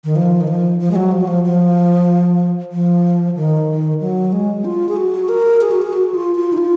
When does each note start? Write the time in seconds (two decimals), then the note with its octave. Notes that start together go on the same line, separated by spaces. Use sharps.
0.04 D#3
0.16 F3
0.41 D#3
0.47 F3
0.80 F3
0.91 G#3
0.96 F#3
1.12 F3
1.21 F#3
1.27 F3
1.44 F3
2.72 F3
3.36 D#3
4.00 F#3
4.32 G#3
4.65 F4
4.89 G#4
4.97 F#4
5.29 A#4
5.61 G#4
5.71 F#4
5.82 G#4
5.93 F#4
6.14 F4
6.36 F4
6.53 D#4
6.57 F4